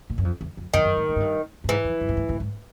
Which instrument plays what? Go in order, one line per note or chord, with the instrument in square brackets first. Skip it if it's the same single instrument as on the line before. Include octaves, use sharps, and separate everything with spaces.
[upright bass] A#2
F#2
F2
E2
F2
[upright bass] F#2 [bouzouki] D#3
[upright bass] F#2
G#2
A2
G#2
G2
G2
[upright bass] G#2 [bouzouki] E3
[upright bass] F2
G2
A2
G#2
A2
G#2